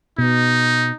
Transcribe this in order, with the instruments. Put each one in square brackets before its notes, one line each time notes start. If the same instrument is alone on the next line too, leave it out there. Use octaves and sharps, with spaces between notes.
[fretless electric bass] B2 [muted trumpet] D#4